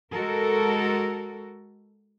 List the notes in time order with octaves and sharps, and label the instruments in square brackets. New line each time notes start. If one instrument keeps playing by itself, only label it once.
[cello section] G#3 F#4 A4 A#4